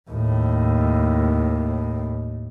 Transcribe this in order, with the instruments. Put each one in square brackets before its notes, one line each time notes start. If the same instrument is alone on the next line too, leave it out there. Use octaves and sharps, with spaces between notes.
[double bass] D#2 A2